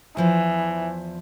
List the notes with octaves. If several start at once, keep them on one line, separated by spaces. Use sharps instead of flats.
E2 E3 F3 C5